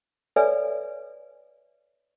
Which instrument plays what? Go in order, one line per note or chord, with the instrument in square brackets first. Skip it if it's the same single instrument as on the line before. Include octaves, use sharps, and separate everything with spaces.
[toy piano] A4 B4 C#5 D5 E5 G#5